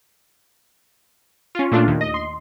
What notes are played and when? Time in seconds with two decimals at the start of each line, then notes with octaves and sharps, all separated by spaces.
1.55 C#4 F4
1.72 A#2 A3 D4 F4
1.88 D#2
2.01 D#5
2.14 C6